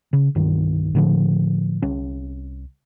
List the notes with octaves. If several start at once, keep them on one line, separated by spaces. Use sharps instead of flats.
C#3
C2 G2 D#3
A2 D3 F3
C2 C#4